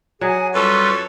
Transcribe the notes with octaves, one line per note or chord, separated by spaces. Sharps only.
F#3 G#4 F#5 G#5
F#2 G3 F4 A4 B4 C#5 C#6